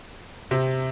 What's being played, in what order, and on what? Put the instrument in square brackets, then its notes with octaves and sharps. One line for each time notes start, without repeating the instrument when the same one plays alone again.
[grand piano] C3 C4